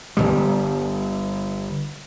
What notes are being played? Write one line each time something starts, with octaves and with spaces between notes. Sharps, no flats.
G1 D#2 G3